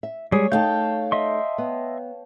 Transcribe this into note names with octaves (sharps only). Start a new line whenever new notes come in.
E5
G3 G#3 G#4 C#5
A3 D#4 F5 G5 A5 G6
D#5 E5 C6
B3